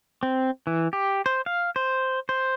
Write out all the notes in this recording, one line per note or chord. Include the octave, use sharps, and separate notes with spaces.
C4
E3
G4
C5
F5
C5
C5